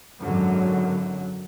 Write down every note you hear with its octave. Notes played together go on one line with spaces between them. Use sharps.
G#1 F#2 D3 F#3